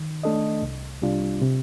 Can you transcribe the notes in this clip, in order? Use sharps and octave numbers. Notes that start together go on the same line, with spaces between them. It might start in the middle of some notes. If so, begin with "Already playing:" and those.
Already playing: D#3
A3 D4 A4 D#5
C2
C3 G3 D4 F4
C3